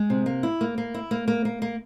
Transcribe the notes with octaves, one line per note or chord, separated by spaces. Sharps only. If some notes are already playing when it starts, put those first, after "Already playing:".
Already playing: G#3
C3
A#3
E4
A#3
A#3
E4
A#3
A#3
A#3
A#3